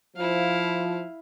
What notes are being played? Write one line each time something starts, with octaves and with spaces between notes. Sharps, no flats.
F3 E4 F5